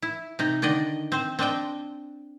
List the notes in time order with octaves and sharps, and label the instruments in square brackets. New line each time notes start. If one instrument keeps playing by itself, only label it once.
[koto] E4
C3 D#4
D3 D#3 D5 D#5
C4 C5
C4 D4 D#5 G5